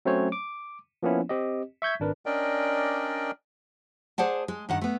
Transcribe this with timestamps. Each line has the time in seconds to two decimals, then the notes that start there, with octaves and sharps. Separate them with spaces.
0.05 F#3 A3 C4 C#4 C5 C#5
0.32 D6
1.03 F3 A#3 B3 C#4 E4
1.29 C4 G4 D#5
1.82 E5 C#6 G6 G#6 B6
2.00 G#1 D4 A#4 B4
2.26 C#4 D4 A#4 D5 D#5 G5
4.18 G#4 C5 D5 F#5 A5
4.48 G#3
4.69 G2 D#3 F#5
4.81 A3 B3